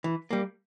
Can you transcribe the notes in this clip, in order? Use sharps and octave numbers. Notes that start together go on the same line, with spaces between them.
E3
G3 A#3